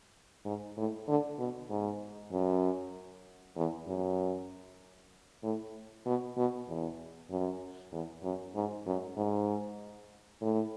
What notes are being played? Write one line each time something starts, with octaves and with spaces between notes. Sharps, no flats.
G#2
A2
D3
B2
G#2
F#2
E2
F#2
A2
B2
B2
E2
F#2
E2
F#2
G#2
F#2
G#2
A2